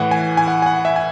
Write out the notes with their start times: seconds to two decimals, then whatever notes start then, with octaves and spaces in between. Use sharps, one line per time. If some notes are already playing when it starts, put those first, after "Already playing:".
Already playing: A2 E3 F#5
0.11 G#5
0.37 G#5
0.48 F#5
0.62 G#5
0.66 F#5
0.85 E5
0.96 G#5